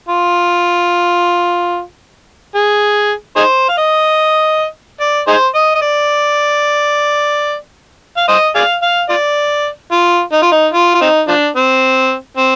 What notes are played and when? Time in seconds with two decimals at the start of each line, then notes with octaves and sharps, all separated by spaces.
0.09 F4
2.55 G#4
3.36 D#4 G#4 C5
3.69 F5
3.78 D#5
5.01 D5
5.28 D#4 G#4 C5
5.55 D#5
5.75 D#5
5.82 D5
8.17 F5
8.28 C5 D#5
8.55 G#4 D5 F5
8.83 F5
9.10 F4 D5
9.92 F4
10.33 D#4
10.42 F4
10.52 D#4
10.74 F4
10.95 F4
11.01 C4 D#4
11.28 F3 D4
11.56 C4
12.37 C4